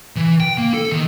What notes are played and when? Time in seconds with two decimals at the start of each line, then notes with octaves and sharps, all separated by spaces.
0.16 E3
0.40 G5
0.58 A#3
0.74 A4
0.92 D#3